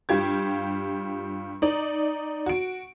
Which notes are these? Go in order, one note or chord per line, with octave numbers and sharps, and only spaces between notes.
G2 F4 G4 G#6
D#4 D5
F#4 D7